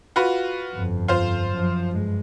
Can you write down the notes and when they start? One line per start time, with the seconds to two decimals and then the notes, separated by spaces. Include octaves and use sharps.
0.16 F4 F#4 B4
0.74 G1 F2
1.08 F4 C5
1.54 F#2 F3
1.90 G2 G#3